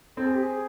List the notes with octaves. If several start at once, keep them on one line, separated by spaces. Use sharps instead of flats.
C4 A4
G#4
G4
G#4